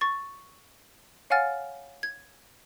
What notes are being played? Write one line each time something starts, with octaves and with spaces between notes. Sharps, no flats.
C#6 A6
C#5 F5 F#5 G#5 F6 A6
G#6